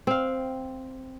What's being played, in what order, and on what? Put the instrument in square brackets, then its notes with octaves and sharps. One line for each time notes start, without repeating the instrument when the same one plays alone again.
[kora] C4 F5